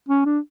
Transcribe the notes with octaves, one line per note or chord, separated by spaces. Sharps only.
C#4
D4